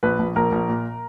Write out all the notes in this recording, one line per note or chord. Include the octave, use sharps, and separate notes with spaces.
A#1 B4
A#1
A#1 A#4
A#1
A#2